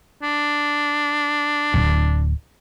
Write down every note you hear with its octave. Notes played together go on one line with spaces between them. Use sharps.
D4
D1